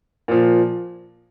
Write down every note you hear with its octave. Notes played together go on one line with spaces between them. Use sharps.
A#2 F3